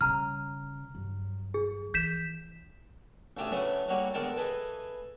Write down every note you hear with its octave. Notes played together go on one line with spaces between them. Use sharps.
C#3 G3 A#5 F6
G2 F#3
G#4
E3 G6 B6 E7
A1 D2 D4 G4 G#4 E5
C#3 E3 F#3 A3 C#4 D4
D3 F#3 G3 A#3 F#4
E2 D3 G#3 A#4 G5 A5
E3 G#4 A4 B4 D#5